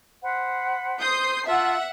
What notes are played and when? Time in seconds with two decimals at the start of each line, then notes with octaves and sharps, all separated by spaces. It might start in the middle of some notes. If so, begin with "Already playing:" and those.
0.22 C5 F#5 B5
1.01 C5 D#6 G6 C7
1.46 F4 E5 F#5 A5 E6